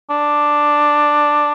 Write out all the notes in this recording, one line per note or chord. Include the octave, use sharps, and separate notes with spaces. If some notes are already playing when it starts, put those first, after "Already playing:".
D4